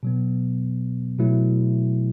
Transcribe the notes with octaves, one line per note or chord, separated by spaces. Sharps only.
B2 F#3 B3
B2 F#3 A3 E4